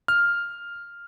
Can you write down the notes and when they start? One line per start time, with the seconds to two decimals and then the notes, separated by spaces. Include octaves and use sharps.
0.08 F6